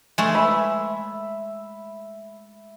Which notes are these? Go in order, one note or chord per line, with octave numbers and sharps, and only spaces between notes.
G#3 A3
E5 B5